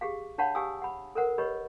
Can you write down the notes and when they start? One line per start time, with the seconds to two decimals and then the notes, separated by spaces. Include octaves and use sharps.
0.01 G4 G#4 F5
0.38 D4 C#5 F5 F#5 A5 B5
0.55 G4 F5 G#5 D#6 E6
0.82 F#5 B5
1.15 A4 A#4 C5 F#5
1.38 G4 B4 C#5 D#5 B5